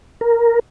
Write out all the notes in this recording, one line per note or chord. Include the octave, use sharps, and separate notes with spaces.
A#4